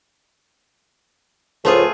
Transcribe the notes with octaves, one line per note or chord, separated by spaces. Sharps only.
C#2 A2 F3 A3 F4 G#4